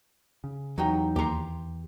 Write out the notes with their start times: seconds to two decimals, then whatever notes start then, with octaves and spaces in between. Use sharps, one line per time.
0.44 C#3
0.78 E2 F#3 D#4 G4
1.16 D#2 G4 A#5 C6